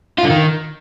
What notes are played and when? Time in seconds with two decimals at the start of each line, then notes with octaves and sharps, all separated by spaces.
0.19 F4
0.24 D3
0.30 D#3